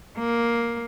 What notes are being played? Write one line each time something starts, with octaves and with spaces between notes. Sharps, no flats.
A#3